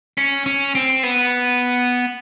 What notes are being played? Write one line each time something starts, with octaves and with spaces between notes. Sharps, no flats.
C#4
C#4
C4
B3